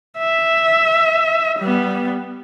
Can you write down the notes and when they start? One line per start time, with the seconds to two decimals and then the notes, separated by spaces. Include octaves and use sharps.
0.18 E5
1.59 G3 B3